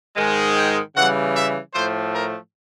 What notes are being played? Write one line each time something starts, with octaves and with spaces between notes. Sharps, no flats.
G#2 D#3 G#3
G5
C#3 E3 G3 F#5
E5
A2 F3 A3 C5
A#4